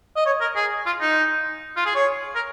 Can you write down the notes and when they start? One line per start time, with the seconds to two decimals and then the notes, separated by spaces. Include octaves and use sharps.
0.16 D#5
0.26 C#5
0.41 A#4
0.56 G#4
0.86 F4
1.01 D#4
1.76 F4
1.86 G#4
1.95 C#5
2.35 A#4